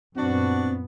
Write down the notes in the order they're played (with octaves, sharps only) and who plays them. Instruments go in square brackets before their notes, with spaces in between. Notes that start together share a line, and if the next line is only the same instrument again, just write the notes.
[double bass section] F#2 A#2 B3 [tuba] C4 [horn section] D4 F#4